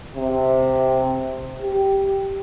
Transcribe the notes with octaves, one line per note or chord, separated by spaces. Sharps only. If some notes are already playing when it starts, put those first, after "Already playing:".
C3
G4